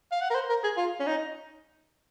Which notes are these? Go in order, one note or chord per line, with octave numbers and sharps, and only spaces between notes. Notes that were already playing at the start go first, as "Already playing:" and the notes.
F5
F#5
A#4
C5
A#4
G#4
F4
C#4
D#4